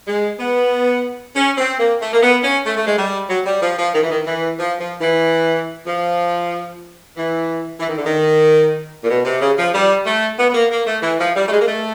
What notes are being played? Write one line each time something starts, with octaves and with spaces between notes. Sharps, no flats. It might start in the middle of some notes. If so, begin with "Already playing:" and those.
G#3
B3
C#4
C4
A#3
A3
A#3
B3
C#4
A3
A3
G#3
G3
F#3
G3
F3
F3
D#3
E3
D#3
E3
F3
F3
E3
F3
E3
E3
D#3
D3
D#3
A#2
B2
C3
C#3
F3
G3
A3
B3
B3
A#3
A#3
A3
E3
F3
G3
A3
G#3
A#3
A3